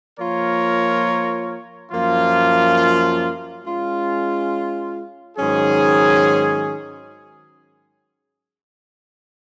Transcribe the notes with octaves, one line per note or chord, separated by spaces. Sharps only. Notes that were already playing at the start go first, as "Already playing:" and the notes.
F3 A#3 F4 A#4 C#5
F#2 F3 A#3 F4
G#3 C#4 F4
G#2 D#3 F#3 C#4 G#4